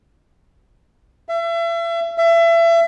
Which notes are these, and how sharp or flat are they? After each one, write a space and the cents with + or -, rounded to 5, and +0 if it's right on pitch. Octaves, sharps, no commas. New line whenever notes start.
E5 +35
E5 +30